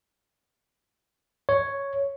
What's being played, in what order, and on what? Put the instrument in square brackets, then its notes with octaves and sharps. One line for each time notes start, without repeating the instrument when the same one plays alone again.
[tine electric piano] C#5